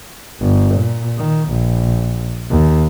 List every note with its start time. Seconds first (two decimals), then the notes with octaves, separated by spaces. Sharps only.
0.41 G1
0.75 A#2
1.17 D#3
1.49 A#1
2.50 D#2